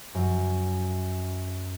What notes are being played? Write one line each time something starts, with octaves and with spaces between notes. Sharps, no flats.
F#2 F#3